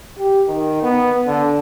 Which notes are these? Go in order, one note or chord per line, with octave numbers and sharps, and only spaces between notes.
G4
D#3
B3
D3